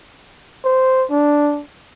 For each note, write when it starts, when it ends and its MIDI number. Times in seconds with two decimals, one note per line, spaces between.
0.65 1.05 72
1.11 1.62 62